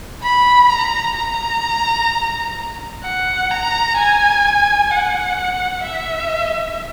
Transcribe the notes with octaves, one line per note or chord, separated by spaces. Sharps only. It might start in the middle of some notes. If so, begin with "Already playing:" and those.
B5
A#5
A#5
F#5
A#5
G#5
F#5
E5